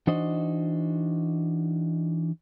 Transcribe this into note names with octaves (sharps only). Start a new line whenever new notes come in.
E3 D4 D#4 F#4 C5 D#5